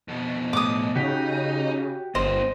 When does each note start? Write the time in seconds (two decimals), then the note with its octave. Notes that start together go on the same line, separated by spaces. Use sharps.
0.08 F2 B2
0.53 A2 D6 D#6
0.96 C#3 D#4 F#4 G4
2.15 G1 A#3 C4 C5 D#5